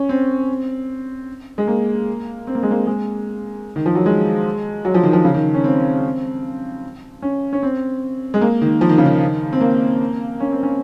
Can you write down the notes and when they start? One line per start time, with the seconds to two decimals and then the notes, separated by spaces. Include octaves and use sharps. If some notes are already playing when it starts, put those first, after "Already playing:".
Already playing: C#4
0.09 C4
1.58 G#3
1.67 A#3
2.47 C4
2.55 A#3
2.63 G#3
2.71 A#3
2.87 G#3
3.76 D#3
3.86 F3
3.95 F#3
4.06 G#3
4.85 F#3
4.94 F3
5.03 D#3
5.13 F3
5.24 C#3
5.34 D#3
5.54 C#4
5.64 C4
7.22 C#4
7.53 C#4
7.63 C4
8.34 G#3
8.41 A#3
8.62 D#3
8.81 F3
8.89 D#3
8.98 C#3
9.06 D#3
9.53 C4
9.61 A#3
10.40 C#4
10.52 C4
10.63 C#4